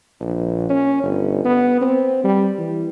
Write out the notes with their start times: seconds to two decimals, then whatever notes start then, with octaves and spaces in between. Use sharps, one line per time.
0.20 A#1
0.69 C#4
1.03 G1
1.45 B3
1.81 C4
2.24 G3
2.58 E3